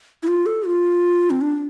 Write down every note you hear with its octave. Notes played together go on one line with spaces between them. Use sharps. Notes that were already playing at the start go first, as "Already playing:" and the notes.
E4
F4
A4
F4
C4
D4